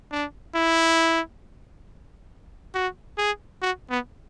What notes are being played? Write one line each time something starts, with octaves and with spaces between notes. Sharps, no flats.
D4
E4
F#4
G#4
F#4
B3